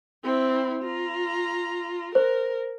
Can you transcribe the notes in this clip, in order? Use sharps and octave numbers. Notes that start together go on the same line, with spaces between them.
C4 E4
F4 A#5
A#4 C5